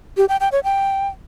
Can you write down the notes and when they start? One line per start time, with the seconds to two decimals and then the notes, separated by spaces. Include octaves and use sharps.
0.17 G4
0.29 G5
0.40 G5
0.52 C#5
0.64 G5